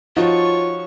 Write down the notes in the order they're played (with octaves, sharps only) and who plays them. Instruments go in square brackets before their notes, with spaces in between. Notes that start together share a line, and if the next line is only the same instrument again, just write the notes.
[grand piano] F3 D#4 F#4 [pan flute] F4 [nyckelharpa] C#5 C#6